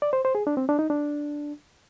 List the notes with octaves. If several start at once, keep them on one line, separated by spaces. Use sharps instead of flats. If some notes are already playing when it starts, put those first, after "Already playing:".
D5
C5
C5
G#4
D4
C4
D4
D#4
D4